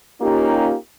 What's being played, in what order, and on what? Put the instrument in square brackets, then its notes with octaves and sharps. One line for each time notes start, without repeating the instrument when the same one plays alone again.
[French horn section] A#3 C#4 D#4 F4 G4